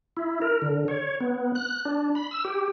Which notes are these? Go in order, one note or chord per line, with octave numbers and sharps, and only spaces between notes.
E4
A#4
D3
C#5
B3
F#6
D4
B5
E6
G4